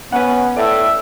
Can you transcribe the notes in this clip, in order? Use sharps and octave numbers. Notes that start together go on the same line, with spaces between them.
B3 C#4 B4 F#5
A2 A4 D5 E5